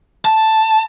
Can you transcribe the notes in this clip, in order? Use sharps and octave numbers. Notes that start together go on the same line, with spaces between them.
A5